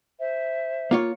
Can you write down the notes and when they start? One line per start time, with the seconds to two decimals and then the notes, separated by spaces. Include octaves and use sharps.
0.19 C5 E5
0.91 A#3 F4 C#5